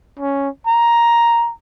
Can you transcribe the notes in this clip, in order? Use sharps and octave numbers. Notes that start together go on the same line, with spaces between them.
C#4
A#5